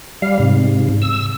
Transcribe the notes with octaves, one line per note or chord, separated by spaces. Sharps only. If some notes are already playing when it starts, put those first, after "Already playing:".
G3 F5
G#2 C3
E6